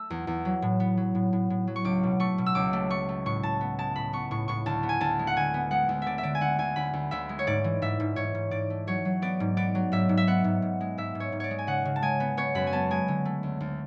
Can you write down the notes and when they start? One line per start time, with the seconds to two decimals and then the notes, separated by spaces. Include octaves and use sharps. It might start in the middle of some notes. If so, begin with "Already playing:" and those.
Already playing: A3 E6
0.10 E2
0.27 E2
0.45 F#3
0.62 A2
0.80 B3
0.97 F#3
1.15 A2
1.33 A2
1.50 A2
1.67 F#3
1.76 C#6
1.85 C#2 D6
2.03 B2
2.20 A3 C#6
2.38 B2
2.46 E6
2.55 C#2 D6
2.73 A3
2.90 A3 C#6
3.09 A3
3.26 A2 C#6
3.43 A2 A5
3.61 B3
3.79 G#3 A5
3.96 A2 B5
4.13 B3 C#6
4.31 A2 C#6
4.48 A2 C#6
4.66 D2 A5
4.83 B3
4.89 G#5
5.01 D2 A5
5.19 G#3
5.27 F#5
5.36 D3 G#5
5.54 B3
5.71 G#3 F#5
5.89 D2
6.02 D3 D5 E5
6.18 E5
6.23 D3 D5
6.35 G#5
6.41 D2 F#5
6.58 D2 G#5
6.76 D2 B5
6.93 D2
7.11 D2 E5
7.29 G#3
7.39 C#5
7.47 G#2 D5
7.64 E3
7.82 G#2 E5
8.00 G#2
8.16 G#2 C#5
8.35 G#2
8.51 G#2 D5
8.70 A3
8.87 F#3 C#5
9.05 F#3
9.22 B3 D5
9.40 G#2
9.57 B3 D5
9.75 F#3
9.92 G#2 E5
10.09 G#2
10.17 E5
10.27 B3 F#5
10.44 G#2
10.62 G#2
10.81 G#3
10.98 G#2 E5
11.15 G#2
11.20 C#5
11.32 G#2
11.40 C#5 D5
11.51 G#3
11.59 G#5
11.67 C#3 F#5
11.85 C#3
11.96 A5
12.02 G#3 G#5
12.20 B3
12.37 B3 C#5
12.55 F#2 B5
12.67 G#5
12.73 B3 A5
12.91 G#3 G#5
13.08 D3
13.25 A3
13.43 D2
13.61 D2